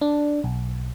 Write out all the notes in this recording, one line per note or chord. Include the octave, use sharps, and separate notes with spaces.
D4
B1